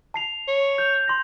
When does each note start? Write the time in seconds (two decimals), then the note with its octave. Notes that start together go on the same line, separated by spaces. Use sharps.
0.14 A5 C7 F7
0.48 C#5
0.78 G6 F7
1.08 C6 A#6